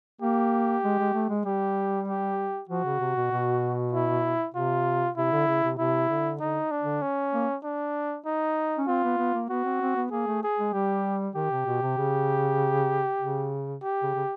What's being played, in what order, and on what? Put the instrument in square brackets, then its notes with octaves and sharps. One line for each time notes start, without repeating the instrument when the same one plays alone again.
[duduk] A#3 [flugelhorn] G4
[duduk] G#3
G#3
A3
G#3
[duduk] G3 [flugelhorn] G4
[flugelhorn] G4
[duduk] F3 [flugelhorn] F#4
[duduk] C#3
C3
B2
B2
[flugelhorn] E4
[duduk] C3 [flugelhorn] F4
[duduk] C3 [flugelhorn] E4
[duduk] D3
C#3
C3
[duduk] C3 [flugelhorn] E4
[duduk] D3
[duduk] D3 [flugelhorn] D#4
[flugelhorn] D4
[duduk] D3
[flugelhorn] C#4
[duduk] A#3
[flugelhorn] D4
D#4
[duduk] C#4
[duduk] C4 [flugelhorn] F4
[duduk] B3
B3
A#3
[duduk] B3 [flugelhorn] F#4
[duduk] C4
C4
B3
[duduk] A#3 [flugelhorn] G#4
[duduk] A3
[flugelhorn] G#4
[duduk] G#3
[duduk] G3 [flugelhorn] G4
[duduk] D#3 [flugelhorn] G4
[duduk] C3
B2
C3
C#3
C#3
[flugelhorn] G4
[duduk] C#3
C#3